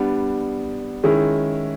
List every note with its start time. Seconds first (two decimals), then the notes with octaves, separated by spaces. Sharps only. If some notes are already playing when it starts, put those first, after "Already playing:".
Already playing: G3 B3 D4
1.04 D#3 G#3 C#4 E4 G#4